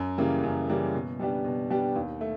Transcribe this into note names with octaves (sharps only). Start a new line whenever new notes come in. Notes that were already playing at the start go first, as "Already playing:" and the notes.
Already playing: F#2
C#3 E3 G3 A#3
F#2
C#3 E3 G3 A#3
B2
G3 B3 D4 G4
B2
G3 B3 D4 G4
D#2
A3